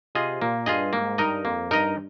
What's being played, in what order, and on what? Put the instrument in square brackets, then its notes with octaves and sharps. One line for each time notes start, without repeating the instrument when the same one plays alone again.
[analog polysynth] C3 [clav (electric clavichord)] F4 G#4 D#5
[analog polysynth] A#2 [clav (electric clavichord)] A#3
[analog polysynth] G2 [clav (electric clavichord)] F4 G#4 D#5
[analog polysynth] G#2 [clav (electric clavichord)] A#3
[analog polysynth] G2 [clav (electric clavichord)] D#4 A#4 D#5
[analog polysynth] F2 [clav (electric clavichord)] A#3
[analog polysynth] G2 [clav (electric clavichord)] D#4 A#4 D#5